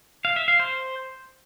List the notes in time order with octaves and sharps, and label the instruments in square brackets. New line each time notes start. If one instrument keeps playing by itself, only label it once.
[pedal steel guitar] F5
E5
F5
C5